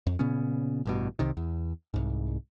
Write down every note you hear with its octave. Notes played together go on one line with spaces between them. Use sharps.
F2
A#2 C#3 B3 C#4
A1 G2 B2
C2 C3 D#3
E2
C2 G#2